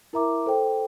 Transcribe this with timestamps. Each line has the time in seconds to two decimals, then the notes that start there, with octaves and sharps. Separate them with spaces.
0.13 E4 A#4 E5 A#5 D6
0.46 A4 C5 G5